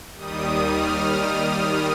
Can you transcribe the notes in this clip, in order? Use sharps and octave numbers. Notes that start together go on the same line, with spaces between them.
D#2 D#3 G3 D#6
F6